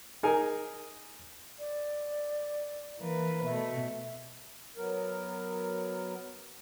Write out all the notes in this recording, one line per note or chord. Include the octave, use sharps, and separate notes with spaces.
D#4 G#4 A#4 G#5
D5
E3 A#3 B4
B2 A3 E5
F#3 B3 A#4